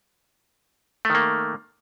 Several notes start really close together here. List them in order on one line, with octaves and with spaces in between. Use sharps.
A3 D#3 A#3